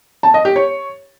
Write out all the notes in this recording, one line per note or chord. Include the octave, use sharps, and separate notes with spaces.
A5
D#5
G4
C#5